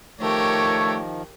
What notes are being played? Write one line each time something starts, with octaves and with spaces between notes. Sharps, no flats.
D#3 F3 A3 G4 A#4 C#5